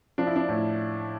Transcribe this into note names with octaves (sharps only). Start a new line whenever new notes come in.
F3 D4
E4
D4
A2